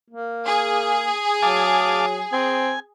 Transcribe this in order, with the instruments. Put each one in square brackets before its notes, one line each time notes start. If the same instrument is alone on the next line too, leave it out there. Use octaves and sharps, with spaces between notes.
[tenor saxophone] A#3
[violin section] G#4
[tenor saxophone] F#3 [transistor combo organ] F5 A5 D6
[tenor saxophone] C4 [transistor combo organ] G#5